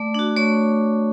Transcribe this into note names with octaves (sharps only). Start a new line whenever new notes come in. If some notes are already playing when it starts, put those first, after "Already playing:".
Already playing: A3 D5 D6
D4 F#4
A3 C#5 C#6